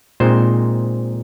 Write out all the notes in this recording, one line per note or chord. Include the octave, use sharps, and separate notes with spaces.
A#2 G#3 C4 D#4 C5